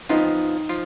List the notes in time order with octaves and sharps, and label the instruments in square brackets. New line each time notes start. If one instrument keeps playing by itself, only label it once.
[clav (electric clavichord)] F2 F3 B3 F4 [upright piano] D#4
[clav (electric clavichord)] F3 F4